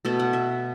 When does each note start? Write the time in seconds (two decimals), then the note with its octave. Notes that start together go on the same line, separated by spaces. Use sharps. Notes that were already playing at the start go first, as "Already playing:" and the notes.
0.05 B2 A3 E5
0.19 F#5
0.33 E5